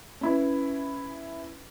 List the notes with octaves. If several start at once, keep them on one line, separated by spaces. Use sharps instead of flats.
C#4 E4 B4